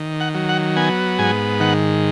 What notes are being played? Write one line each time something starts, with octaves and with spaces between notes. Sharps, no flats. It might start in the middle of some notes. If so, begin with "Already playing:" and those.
Already playing: D#3
F#5
F#3
F#5
B3 G#5
G#2 G#5
D#3 F#5